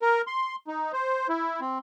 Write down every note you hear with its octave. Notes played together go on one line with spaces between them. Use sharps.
A#4
C6
D#4
C5
E4
C4